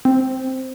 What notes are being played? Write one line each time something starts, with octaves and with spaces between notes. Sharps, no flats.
C4